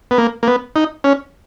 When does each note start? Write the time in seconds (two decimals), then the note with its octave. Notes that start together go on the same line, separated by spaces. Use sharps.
0.11 B3
0.18 A#3
0.43 A#3
0.47 B3
0.76 D#4
1.04 C#4